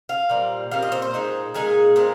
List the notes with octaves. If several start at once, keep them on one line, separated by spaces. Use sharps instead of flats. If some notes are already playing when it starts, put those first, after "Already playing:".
F5
A#2 G3 C4
A#2 G3 C4 F5
D#5
C5
C5
A#2 G#3 D#4
A#2 G#3 D#4 G#4
A#2 G#3 C4